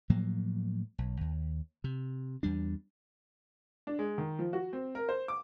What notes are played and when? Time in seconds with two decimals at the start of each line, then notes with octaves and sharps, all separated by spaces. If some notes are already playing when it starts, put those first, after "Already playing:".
0.10 A2 F3 F#3 A#3
0.98 B1
1.21 D#2
1.84 C3
2.43 E2 G3 D4
3.87 D4
3.99 G#3
4.18 D#3
4.39 F3
4.53 F#4
4.73 C4
4.95 A#4
5.09 C5
5.28 D6